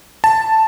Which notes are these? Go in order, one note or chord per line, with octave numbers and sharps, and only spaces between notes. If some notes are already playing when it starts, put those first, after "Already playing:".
A5